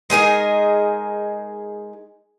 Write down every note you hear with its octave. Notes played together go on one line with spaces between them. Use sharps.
G#3 D#4 G#4 A#4